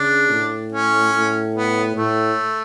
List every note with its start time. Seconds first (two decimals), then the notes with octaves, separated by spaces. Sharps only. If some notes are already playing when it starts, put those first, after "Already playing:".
Already playing: C#3 D4
0.31 A2
0.72 C#4
1.14 A2
1.54 B3
1.95 A2 A3